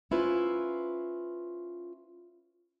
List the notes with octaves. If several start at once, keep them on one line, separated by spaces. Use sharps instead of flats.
C#4 E4 F4 B4 C5